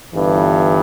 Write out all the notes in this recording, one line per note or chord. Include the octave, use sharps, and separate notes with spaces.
G1 G2 E3